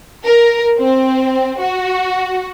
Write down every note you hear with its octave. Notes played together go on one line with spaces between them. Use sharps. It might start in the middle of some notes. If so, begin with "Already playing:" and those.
A#4
C4
F#4